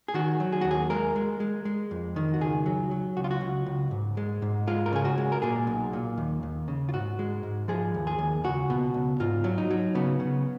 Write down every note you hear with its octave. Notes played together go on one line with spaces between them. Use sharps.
G#4
D#3 F#4
F#3
G#4
D#2 F#4
G#4
G#3 A#4
G#3
G#3
G#3
F2
D#3
F#4
C#2 G#4
F#3
F#3
C#2 F#4
F4
F#4
C#2
C#2
G#2
G#3
G#2
G#3 F4
A#4
C#3 G#4
F#4
G#3
A#4
A#2 G#4
B1
A#2
D#2
D#2
C#3
F4
G#2 F#4
G#3
G#2
F3 G#4
D#2
G#4
D#2
C#2 F#4
B2
C#2
G#2 F4
F#3
D#4
F#3
C#3 B3
C#3